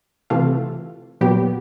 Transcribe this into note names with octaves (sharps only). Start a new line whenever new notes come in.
C3 E3 A3 F4
A#2 F#3 B3 G4